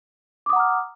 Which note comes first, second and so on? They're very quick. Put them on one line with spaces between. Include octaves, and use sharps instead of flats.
D6 D#6 F#5 A#5 F6